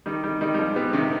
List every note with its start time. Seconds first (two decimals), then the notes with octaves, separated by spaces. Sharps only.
0.06 D#3 G3
0.24 D#3 G3
0.41 D#3 G3
0.54 G3
0.58 F3 G#3
0.76 G3 B3
0.93 C3 D#3